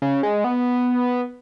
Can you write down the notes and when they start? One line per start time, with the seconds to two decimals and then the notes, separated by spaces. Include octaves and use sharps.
0.02 C#3
0.23 G#3
0.44 B3